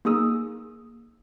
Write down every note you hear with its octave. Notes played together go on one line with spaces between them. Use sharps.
A#3 D#4 G#4 D#6 E6